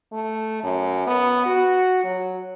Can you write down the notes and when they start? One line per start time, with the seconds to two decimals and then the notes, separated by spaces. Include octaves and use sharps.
0.12 A3
0.63 F#2
1.07 B3
1.45 F#4
2.04 F#3